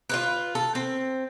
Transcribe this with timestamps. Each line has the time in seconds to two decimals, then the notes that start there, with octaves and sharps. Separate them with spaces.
0.09 F4 G4 B4
0.55 A4
0.75 C4